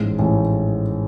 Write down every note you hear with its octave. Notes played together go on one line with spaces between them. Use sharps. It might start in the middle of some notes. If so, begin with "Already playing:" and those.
Already playing: A1 G#2
A1